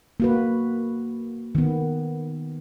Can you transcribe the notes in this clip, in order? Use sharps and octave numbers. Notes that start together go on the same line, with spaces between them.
A#3 F#4 B4
D#3 B3